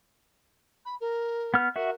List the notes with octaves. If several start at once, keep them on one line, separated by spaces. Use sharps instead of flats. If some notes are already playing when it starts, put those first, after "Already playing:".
B5
A#4
B3 F6
F#4 A#4 E5